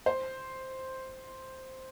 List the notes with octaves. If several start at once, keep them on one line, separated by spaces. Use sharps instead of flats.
C5